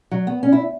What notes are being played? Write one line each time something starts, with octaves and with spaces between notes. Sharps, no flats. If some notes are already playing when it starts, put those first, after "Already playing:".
F#3
B3
C#4
E4